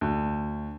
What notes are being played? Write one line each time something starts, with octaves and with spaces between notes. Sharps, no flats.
D2